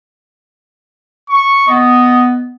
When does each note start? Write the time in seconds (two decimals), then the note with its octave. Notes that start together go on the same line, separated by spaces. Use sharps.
1.30 C#6
1.68 B3 D#5